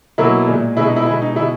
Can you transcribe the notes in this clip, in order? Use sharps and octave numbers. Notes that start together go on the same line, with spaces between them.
B2 F#3 A#3 E4
A#2 G#3
B2 G#3 E4
D#4
E4
B2 G#3 E4
D#4
B2 G#3 E4